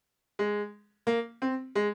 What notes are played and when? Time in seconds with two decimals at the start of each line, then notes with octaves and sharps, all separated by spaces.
0.39 G#3
1.07 A#3
1.42 C4
1.75 G#3